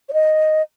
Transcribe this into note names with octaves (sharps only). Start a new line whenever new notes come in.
C#5
D#5